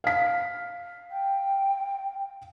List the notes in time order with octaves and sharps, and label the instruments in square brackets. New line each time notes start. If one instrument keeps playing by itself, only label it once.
[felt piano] F5 B6
[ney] G5